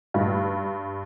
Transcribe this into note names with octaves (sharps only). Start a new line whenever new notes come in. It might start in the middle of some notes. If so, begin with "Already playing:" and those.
G2